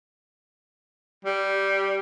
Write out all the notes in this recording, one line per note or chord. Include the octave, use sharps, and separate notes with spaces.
G3